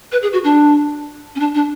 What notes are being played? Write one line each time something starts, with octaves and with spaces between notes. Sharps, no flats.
B4
G#4
F#4
D4
C#4
D4
D4